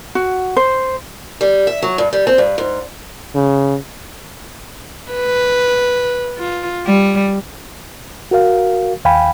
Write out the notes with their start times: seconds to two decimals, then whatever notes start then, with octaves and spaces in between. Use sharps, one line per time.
0.15 F#4
0.56 C5
1.41 G3
1.67 E5
1.82 F#3
1.98 G2
2.13 G3
2.27 C4
2.38 G2
2.58 G#2
3.35 C#3
5.11 B4
6.39 F4
6.87 G3
8.31 F#4 A#4 F5
9.05 D#2 F5 G5 G#5 B5